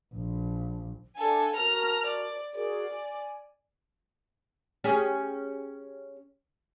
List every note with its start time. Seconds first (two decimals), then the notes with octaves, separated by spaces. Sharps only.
0.15 A#1
1.16 D4 A4 E5 F#5 G#5
1.56 F#4 A#4 A5 A#5 F6
2.06 D5
2.54 F#4 G#4 A#4 D5
2.90 G#5
4.84 C#4 G4 G#4